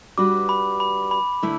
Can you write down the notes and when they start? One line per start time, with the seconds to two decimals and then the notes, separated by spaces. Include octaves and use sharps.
0.18 G3 D4 F#4 B4 D6
0.49 B5
0.80 B5
1.11 B5
1.43 D3 A3 E4